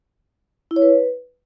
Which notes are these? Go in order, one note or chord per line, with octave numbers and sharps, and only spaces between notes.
E4
C#5
B4